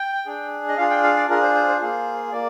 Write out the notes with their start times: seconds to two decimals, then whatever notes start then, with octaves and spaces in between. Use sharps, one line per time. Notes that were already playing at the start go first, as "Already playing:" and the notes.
Already playing: G5
0.26 D4 G#4
0.69 D#5
0.77 D4 F4 G#4 F5
0.90 G5
1.03 F5
1.17 D5
1.29 D4 F4 G#4 A#4
1.42 C5
1.55 C5
1.69 C5
1.81 A#3 F4 G#4
2.32 A#3 D5